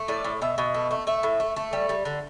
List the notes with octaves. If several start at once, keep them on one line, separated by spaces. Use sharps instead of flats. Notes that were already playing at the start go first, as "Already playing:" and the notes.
Already playing: A3
A2 D5
A2
B2 E5
B2
A3
A3
A3 E5
A2
A3
A3
G3
G3
D3